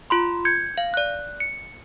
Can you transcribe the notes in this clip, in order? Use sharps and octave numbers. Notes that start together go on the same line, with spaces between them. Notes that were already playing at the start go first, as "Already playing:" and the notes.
F4 B5 C6
G6 G#6 C#7
F5
D5 F#6
C#7